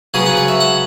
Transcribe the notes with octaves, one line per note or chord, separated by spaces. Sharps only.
C#3 F#3 B3 G#4
B4
C#5
E5
F#5